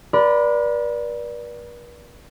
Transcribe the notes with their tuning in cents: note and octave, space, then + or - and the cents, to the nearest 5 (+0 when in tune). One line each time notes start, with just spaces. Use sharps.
B4 -45 D5 +0 B5 +35